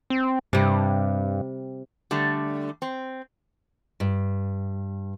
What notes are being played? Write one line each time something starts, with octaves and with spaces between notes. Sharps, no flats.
C4
G2 C3 G3
D3 G3 A3
C4
G2